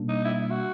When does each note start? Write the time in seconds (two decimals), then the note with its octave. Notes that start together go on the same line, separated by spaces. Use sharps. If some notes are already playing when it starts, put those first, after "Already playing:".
Already playing: B2 G3 A#3 D4
0.09 D#4
0.25 E4
0.42 E4
0.50 F#4